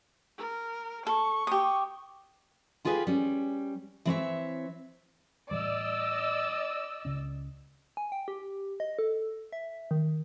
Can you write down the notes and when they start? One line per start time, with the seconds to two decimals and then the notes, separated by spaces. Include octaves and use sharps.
0.38 A#4
1.07 A4 C#6
1.47 G4 D#6
2.85 E4 F4 G4 G#4 B4 F5
3.07 G3 C#4
4.05 E3 C4 C#5 E5
5.51 A2 E3 G3 D5 D#5 E6
7.05 C#2 C#3 C#4
7.97 G#5
8.12 G5
8.28 G4
8.80 D#5
8.99 A4
9.53 E5
9.91 D#3